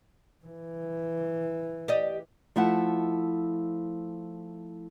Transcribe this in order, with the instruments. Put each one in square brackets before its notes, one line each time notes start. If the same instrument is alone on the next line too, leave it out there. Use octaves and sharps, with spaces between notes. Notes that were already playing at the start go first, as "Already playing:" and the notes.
[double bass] E3
[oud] G4 D5 D#5
[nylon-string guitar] F3 A3 E4 E5 F#5